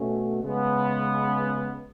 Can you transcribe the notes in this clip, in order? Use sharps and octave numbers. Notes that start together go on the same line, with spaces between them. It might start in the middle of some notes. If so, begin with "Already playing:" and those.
Already playing: B2 A3 C#4
C#3 G#3 B3